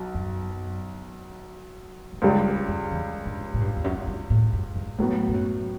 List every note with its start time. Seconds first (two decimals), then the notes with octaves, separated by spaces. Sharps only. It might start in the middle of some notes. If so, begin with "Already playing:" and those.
Already playing: B1 F#3
0.14 F#2
2.13 G2
2.22 C#2 F#2 C#3 G3
2.45 E2
2.68 F#2
2.91 E2
3.26 G2
3.54 A2
3.60 G2
3.76 E2
3.84 F#2
4.07 G2
4.30 A2
4.53 F#2
4.76 F#2
4.98 E2 A2 F#3 B3
5.28 G2
5.34 F#2